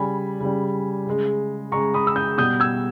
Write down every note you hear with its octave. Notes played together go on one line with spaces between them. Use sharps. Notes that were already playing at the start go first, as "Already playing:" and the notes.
Already playing: C#3 G3 G#5 B5
C#3 G3
C#3 G#3
C#3 G#3 A#5 C#6
B5 D#6
E6
D#6 G6
B2 G3 D#6 G6
E6 G#6